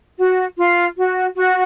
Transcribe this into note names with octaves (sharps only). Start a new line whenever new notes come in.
F#4
F4
F#4
F#4